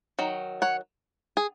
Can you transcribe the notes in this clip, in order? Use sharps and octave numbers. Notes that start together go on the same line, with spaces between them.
D#3 F#3
C#5 F#5
G#4